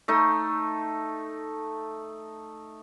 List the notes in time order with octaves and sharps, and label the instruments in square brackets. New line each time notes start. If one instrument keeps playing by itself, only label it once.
[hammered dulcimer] A3 D#4